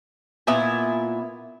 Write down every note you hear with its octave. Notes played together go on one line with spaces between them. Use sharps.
A#2 B3 E4 G#5